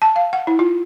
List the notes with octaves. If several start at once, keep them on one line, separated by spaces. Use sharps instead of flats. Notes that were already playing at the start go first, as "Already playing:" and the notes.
A5
F5
F#5
E4
F4